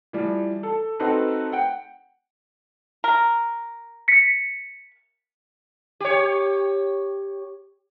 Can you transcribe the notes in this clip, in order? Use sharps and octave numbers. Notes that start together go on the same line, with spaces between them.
E3 F3 G3
A4
C4 D#4 F#4 A4 B4
F#5 G5
A#4
B6 C#7
G4 C#5